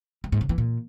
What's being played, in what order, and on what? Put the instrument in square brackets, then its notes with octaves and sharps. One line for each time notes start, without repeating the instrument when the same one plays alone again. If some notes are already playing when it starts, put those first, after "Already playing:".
[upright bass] G2
G#2
C#3
E3
A#2